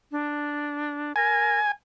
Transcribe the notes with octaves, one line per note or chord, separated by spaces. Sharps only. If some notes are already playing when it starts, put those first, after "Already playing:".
D4
A#4 G#5